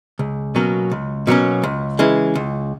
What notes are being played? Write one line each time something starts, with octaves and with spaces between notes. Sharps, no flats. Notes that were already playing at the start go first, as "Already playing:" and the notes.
C#2
B2 F#3 A#3 C#4
C#2
B2 F#3 A#3 C#4
C#2
C#3 E3 G#3
C#2